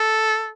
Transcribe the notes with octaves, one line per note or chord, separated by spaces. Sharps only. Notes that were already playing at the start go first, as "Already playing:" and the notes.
Already playing: A4